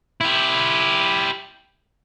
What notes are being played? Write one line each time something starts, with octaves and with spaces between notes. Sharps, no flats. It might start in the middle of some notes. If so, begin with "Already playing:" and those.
E4 G4